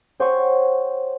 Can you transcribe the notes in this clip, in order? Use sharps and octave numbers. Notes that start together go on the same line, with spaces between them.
G4 C5 C#5 F#5 G#5 C#6